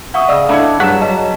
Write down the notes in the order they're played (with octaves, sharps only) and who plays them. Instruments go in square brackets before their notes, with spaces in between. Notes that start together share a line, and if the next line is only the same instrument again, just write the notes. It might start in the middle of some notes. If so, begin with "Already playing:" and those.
[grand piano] E5 C#6 D#6 [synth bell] F#5
[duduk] C#3 [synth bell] D5 [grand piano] D#5 F5 E6
[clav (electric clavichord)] A3 E4 [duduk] D4 [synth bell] F5 B5 [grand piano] E6 G#6 C#7
[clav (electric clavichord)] G2 F#4 F#5 [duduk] F#3 [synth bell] G#4 E7 [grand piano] B6
[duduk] F#3 [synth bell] D#5 A5